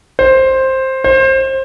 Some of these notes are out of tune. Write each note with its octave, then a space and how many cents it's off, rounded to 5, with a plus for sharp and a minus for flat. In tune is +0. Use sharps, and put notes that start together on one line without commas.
C5 +10
C5 +25